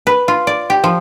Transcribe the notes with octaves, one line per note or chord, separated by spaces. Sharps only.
B4
F4
D5
G4
F3